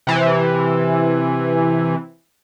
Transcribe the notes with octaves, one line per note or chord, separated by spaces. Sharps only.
C3 E3